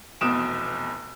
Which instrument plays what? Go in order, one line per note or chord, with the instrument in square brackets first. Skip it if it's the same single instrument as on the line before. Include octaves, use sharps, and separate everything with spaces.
[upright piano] F1 E2 B2 D#6 D7 E7